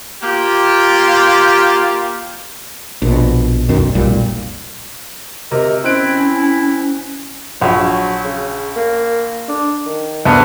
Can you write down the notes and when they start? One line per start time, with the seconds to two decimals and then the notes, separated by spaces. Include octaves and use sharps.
0.23 A#3 F4 G4
3.02 A#1 B2
3.68 F1 B1 F#2 D#3
3.95 F1 B1 A#2 G3
5.52 C3 A#4 D#5
5.84 C4 C#4 E4 F#6 D7
7.61 A#1 F#3
8.24 C#3
8.76 A#3
9.48 D4
9.86 D#3
10.25 D2 B3